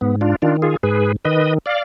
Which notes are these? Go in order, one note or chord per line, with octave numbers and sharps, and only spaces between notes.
G#2 B3
D4 F4
D#3 D4 F4
F4 G#4
G#2 G#4 B4
D#3 B4 D#5
D5 F5